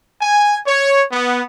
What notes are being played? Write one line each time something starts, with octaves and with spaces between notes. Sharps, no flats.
G#5
C#5
B3